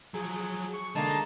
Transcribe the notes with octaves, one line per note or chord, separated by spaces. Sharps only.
F3 F#3 G#4
C#6
D3 G#3 A#3 D#4 A5